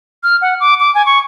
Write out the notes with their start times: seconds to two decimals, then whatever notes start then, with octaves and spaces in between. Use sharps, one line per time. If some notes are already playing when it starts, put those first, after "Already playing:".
0.23 F6
0.42 F#5
0.60 D6
0.80 D6
0.95 G#5
1.06 C#6